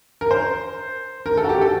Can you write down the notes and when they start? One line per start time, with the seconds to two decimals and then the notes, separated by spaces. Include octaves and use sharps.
0.21 A#4
0.31 C5
1.26 A#4
1.37 A4
1.44 F#4
1.49 G4
1.61 A4